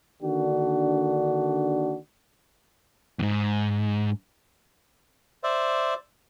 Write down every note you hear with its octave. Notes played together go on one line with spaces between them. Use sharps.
D3 D#3 A#3 D4 F#4
E2 G#2
C5 D5 E5